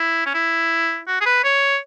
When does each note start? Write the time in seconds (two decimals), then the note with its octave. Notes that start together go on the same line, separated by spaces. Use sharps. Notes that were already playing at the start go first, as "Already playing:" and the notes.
Already playing: E4
0.26 C#4
0.34 E4
1.08 F#4
1.21 G#4
1.26 B4
1.44 C#5